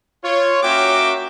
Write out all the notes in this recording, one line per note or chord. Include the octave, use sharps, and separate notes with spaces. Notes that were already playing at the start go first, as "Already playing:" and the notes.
F4 C#5
A#3 C#4 F#4 E5 G5 D6